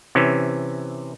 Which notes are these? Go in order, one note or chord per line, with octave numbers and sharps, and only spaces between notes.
C3 E3 C#4